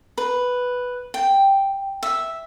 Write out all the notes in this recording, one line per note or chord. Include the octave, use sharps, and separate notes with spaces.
B4
G5
E5